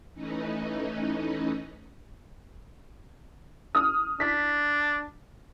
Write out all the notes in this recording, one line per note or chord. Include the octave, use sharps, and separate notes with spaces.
E3 A3 C#4 D#4 B4 D#5
D#6 F6
D4 B6